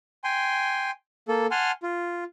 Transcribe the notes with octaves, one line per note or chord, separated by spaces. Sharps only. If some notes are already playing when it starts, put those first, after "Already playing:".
G5 G#5 C6
A#3 A4
F#5 G#5 A5 C6 F6
F4